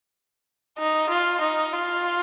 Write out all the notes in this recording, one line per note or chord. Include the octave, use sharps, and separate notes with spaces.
D#4
F4
D#4
F4